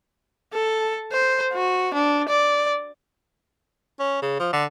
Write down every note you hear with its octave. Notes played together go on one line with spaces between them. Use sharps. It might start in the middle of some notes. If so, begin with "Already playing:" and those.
A4
C5
F#4
D4
D5
C#4
C#3
F3
D3